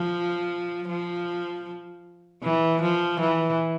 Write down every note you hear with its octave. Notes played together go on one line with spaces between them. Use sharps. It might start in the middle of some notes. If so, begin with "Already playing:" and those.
Already playing: F3
F3
E3
F3
E3